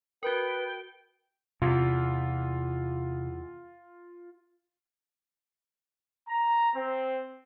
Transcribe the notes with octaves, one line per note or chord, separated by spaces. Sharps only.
F#4 A#4 B4 G5
E2 C3 F4
A#5
C4